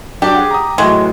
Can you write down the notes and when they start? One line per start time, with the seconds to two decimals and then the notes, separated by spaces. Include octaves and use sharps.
0.22 F#3 D4 G4
0.35 G#4 F#5
0.51 A#5 D#6
0.78 A2 E3 F#3 G#3